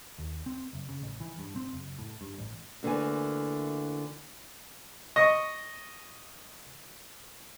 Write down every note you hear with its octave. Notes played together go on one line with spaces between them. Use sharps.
D#2
C4
F#1
C#3
A1
E3
G2
C4
F#1
A2
G2
A1
D2 D3 E3 A#3 G#5
D#5 C#6